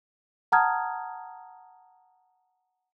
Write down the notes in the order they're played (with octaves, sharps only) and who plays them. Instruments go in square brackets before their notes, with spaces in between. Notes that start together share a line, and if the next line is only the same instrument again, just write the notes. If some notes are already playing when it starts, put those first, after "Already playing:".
[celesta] F#5 A5 A#5 D#6 F6 G#6